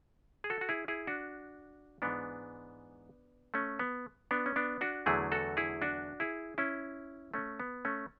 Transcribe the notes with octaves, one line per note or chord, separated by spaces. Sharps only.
G#4
F#4 A4
F#4
E4 G#4
E4 G#4
D4 F#4
G#2 E3 G#3 B3 D4
A3 C#4
B3
B3 D4
C#4
B3 D4
D4 F#4
E2 D3 F#3 A3 E4 G#4
F#4 A4
E4 G#4
D4 F#4
E4 G#4
C#4 E4
A3 C#4
B3
A3 C#4